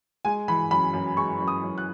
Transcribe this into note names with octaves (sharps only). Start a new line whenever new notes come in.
G#3 G#5
E3 B5
F#2 B5
F#2
G#3 C#6
F#2
D#6
F#2
F#6